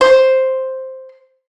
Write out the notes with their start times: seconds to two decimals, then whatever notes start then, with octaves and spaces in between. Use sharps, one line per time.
0.01 C5